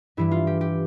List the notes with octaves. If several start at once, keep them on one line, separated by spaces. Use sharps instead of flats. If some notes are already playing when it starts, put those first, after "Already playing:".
G2 E3 G3 E4
F4
G4
G4